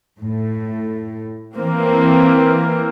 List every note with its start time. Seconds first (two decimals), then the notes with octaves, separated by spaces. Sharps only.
0.20 A2
1.58 E3 A#3 C4